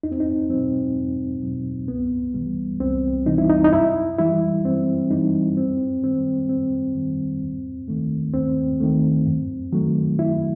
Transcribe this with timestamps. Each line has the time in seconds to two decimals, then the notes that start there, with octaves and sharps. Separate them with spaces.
0.03 E2 D#4
0.12 C4
0.20 D#4
0.49 B2 F#3 C4
0.96 E2
1.42 B2 F#3
1.88 C2 B3
2.34 C3 E3 G3
2.81 C2 C4
3.26 C3 E3 G3 D#4
3.38 E4
3.49 D#4
3.64 D#4
3.73 F#2 E4
4.19 E3 G3 E4
4.65 F#2 C4
5.10 E3 G3 D#4
5.57 F#2 C4
6.04 D#3 G3 C4
6.49 F#2 C4
6.95 D#3 G3
7.42 D#2
7.88 D#3 A3
8.34 D#2 C4
8.81 D#3 A3
9.26 F#2
9.72 D#3 F#3 A3
10.18 F#2 E4